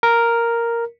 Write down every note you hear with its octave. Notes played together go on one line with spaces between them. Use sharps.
A#4